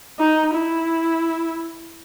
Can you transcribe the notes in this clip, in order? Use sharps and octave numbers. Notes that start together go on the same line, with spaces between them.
D#4
E4